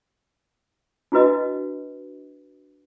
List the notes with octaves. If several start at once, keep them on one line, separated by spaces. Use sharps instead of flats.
D4 E4 F#4 B4 D#5